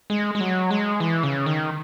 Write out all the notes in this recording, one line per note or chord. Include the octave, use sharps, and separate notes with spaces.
G#3
G#3
F#3
G#3
E3
C#3
D#3